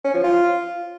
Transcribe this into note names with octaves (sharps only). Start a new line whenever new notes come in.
C#4
F3
F4